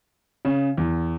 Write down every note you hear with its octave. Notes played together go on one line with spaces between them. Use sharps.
C#3
E2